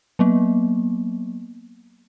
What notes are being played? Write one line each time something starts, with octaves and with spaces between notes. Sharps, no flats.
F#3 A#3 B3